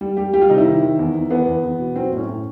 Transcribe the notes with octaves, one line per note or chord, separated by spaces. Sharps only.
G3
G3 G4
G3 G4
F4
C3 D#4
E4
D#3
D#3
E2
E2
E2 B3
E2
E2
B2
F#3 C4
A2 C#4
A2